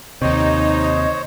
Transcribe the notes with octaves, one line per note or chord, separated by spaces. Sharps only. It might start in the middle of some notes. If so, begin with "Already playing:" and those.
D#2 C3 D#4 C5 C#5 D#5